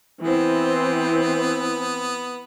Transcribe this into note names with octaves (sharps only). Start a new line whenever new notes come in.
E3 B3 C4